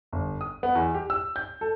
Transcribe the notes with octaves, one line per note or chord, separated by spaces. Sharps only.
G1
D#6
B3
E2
G4
E6
G6
A4